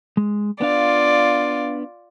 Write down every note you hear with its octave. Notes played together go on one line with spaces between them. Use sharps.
G#3
B3 D4 F4 D5 F5